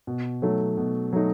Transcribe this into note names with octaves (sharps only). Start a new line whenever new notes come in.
B2
F#3 A3 D#4
B2
F#3 A3 D#4